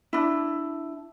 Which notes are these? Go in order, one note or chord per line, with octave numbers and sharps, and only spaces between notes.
D4 E4